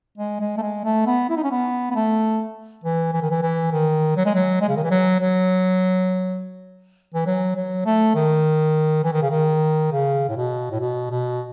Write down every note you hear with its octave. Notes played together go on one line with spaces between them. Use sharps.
G#3
G#3
A3
G#3
A3
B3
E4
D#4
C#4
B3
B3
A3
E3
E3
D#3
E3
E3
D#3
F#3
G#3
F#3
G#3
C#3
D#3
E3
F#3
F#3
E3
F#3
F#3
A3
D#3
E3
D#3
C#3
D#3
C#3
A2
B2
A2
B2
B2